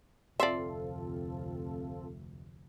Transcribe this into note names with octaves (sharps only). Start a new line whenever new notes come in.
F1 D2 C4 F4 A4 D5 E5 C6